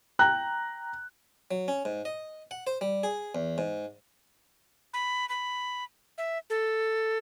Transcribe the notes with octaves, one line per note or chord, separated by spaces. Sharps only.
G5 A#5 F#6
F#3
C#4
G#2
D#5
F#5
C5
G3
G#4
E2
G#2
B5
B5
E5
A4